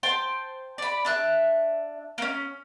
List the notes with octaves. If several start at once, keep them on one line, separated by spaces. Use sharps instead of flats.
C5 G5 A5 C6
D5 B5
D4 E5 F#6
A#3 C#4